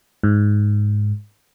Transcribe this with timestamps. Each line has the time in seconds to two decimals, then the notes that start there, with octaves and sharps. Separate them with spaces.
0.23 G#2